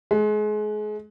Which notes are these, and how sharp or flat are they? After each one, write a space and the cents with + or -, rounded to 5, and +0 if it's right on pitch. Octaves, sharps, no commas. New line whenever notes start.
G#3 +30